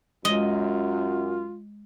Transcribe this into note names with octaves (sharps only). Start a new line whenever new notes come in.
F#2 G#3 F4 D#5